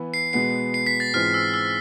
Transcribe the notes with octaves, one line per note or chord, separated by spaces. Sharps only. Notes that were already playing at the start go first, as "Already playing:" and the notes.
Already playing: E3 B3 E4
C7
B2 G#3 B3 C7
C7
B6
A6
G#2 E3 G#3 C4 F4 F6
E6
E6